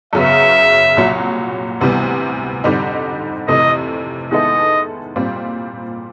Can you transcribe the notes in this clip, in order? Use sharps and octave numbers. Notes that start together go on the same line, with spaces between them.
F#2 C#3 F#3 B3 E5
C2 A#2 F#3
D2 C3 E3 G3 B3
F2 D3 G3 C4 D#4
F2 C3 E3 A3 D#5
D#3 G#3 B3 E4 A4 D#5
A#2 G3 C4 F4